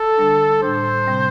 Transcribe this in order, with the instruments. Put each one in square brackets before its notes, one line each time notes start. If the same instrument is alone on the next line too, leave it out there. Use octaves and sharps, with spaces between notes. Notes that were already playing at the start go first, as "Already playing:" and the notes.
Already playing: [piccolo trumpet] A4
[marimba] D3 G3 D4
[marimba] A2 G3 D4 [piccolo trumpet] C5
[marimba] C3 G3 C4